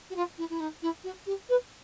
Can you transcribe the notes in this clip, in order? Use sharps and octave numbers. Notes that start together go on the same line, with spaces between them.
F#4
F4
E4
E4
D#4
E4
F#4
G4
B4